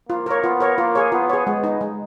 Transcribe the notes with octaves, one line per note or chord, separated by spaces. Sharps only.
A#3 F4
A#4 C#5
B3 F4
A#4 C#5
A#3 F4
G#4 C#5
B3 F4
G#4 C#5
G#3 B3
D#4 G#4
G#3